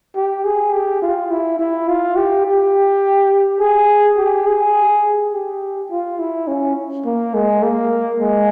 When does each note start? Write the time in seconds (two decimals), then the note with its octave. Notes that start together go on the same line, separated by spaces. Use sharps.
0.15 G4
0.44 G#4
0.73 G4
1.02 F4
1.31 E4
1.59 E4
1.88 F4
2.17 G4
2.45 G4
3.61 G#4
4.18 G4
4.47 G#4
5.33 G4
5.91 F4
6.19 E4
6.48 C#4
7.05 A#3
7.34 G#3
7.63 A#3
8.20 G#3